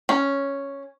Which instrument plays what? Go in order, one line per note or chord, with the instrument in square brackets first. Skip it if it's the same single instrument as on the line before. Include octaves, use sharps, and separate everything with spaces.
[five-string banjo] C#4